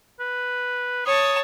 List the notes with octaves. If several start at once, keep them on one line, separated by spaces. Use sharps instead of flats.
B4
C#5 A5 D#6